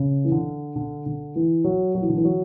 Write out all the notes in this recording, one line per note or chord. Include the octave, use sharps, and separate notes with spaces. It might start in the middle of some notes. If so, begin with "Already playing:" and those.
Already playing: C#3
E3
D3
D3
D3
E3
F#3
F#3
E3
D3
E3
F#3